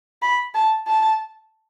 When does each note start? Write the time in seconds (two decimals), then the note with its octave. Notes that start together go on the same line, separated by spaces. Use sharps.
0.22 B5
0.54 A5
0.87 A5